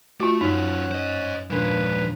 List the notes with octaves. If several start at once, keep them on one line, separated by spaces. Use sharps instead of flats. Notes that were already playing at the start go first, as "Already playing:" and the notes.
A3 F4 F#4
F#2 F#3 C#4 D#4 F4 F#6
C5 D#5
D#2 A#2 F3 G#3 D4 B4